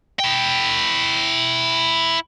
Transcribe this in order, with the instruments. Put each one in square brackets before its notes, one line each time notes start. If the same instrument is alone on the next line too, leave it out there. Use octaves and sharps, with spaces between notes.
[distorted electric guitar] E4 G5